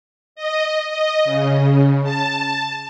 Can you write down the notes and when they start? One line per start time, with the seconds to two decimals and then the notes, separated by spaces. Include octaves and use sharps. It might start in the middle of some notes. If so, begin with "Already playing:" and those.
0.36 D#5
0.91 D#5
1.25 C#3
2.03 A5